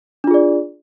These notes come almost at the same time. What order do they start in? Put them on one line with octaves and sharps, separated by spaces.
D4 F4 G#4 D5